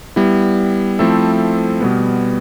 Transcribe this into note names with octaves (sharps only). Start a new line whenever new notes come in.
G3 B3 E4
F3 A3 C4 E4 A4
B2 G3 B3